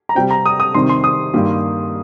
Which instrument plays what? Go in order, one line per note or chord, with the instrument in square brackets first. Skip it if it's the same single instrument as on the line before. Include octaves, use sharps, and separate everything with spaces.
[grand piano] A#5
[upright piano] C3 G3 C4 [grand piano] G5
[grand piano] A#5
D#6
D#6
[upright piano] C3 D#3 G3 C4 [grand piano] C6
[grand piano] C6
D#6
[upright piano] G2 D#3 A#3 G4